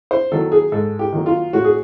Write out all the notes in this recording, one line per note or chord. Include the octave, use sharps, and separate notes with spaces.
C5
D#3 F#3 A#3 A4
G#4
G#2 A4
G4
D#3 F#3 A#3
F4
A2 F#4
G#4